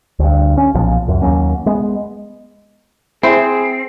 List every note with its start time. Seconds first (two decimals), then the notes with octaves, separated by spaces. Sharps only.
0.19 D2 G2
0.57 C#4
0.74 B1 A#2 F3 B3
1.08 C#2 F#2
1.22 D#2 F#3 A#3 C#4
1.66 G#3 B3
3.23 C4 E4 G#4 C5